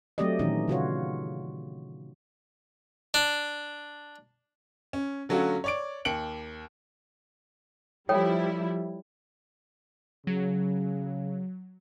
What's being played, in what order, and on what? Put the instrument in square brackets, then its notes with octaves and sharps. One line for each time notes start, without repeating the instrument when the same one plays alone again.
[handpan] F#3 A3 C4 G4 D5 D#5
A#2 D#3 E3 C#4 D#4
C#3 F4 F#4 C#5
[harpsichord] D4
[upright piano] C#4
D3 F#3 A3 C#4 F4 F#4
C#5 D5 D7
D#2 C#7 D7 F#7
[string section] F3 G3 E4 [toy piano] A4 C#5 G5
[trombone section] C#3 [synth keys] F#3